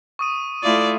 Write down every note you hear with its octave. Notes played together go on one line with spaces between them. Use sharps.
C#6 D#6 D#7
A3 E4 F4 D5